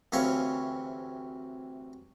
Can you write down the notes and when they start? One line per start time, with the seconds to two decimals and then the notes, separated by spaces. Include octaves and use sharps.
0.12 D2 C3 E3 C#4 C#5 F5